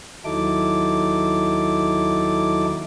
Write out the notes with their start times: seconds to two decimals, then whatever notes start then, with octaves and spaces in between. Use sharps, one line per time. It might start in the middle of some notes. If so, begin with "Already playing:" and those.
0.25 D#2 F#3 D#4 E4 A4 D6